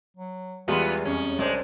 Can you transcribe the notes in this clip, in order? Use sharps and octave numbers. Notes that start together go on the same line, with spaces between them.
F#3
E2 E3 G3 G#3 B3 F4
F2 C#4
C2 G#3 D4 C5